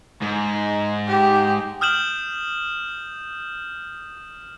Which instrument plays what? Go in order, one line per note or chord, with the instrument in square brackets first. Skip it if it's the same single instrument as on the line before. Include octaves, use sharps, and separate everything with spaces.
[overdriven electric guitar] G#2
[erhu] G4
[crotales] D#6 F6 G6 E7 F#7